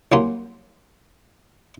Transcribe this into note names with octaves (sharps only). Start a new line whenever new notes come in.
C2 F#3 A#3 C#4 C6